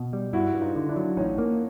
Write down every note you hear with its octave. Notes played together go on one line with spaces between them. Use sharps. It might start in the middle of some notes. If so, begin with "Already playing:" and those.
Already playing: B2
G3
G2 E4 F#4
G2
D#4 F4
D3
D4 E4
F#3
A1 C#4 D#4
A#3